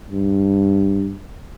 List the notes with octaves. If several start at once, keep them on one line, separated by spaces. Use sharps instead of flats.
G2